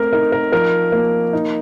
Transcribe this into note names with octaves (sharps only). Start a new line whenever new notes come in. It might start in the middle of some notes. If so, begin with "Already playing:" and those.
Already playing: A3 C4 A#4
D#4 A#4
A#4
F3 A#4
A#3
D#4